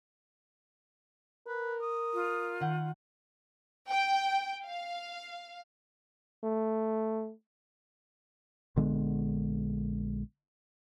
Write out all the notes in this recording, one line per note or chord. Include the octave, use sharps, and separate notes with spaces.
A#4 B4
D#6
F4
D#3 F#5 G6
G5
F5
A3
A#1 D3 G#3 B3